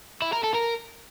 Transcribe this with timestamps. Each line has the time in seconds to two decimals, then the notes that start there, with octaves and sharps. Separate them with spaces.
0.22 E4
0.32 A#4
0.43 A4
0.54 A#4